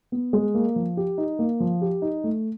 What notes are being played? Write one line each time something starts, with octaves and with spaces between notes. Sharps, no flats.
B3
G#3
A#3
F3
G4
D#4
A#3
F3
G4
D#4
A3